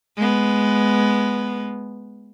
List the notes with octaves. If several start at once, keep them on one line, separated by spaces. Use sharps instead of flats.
G#3 B3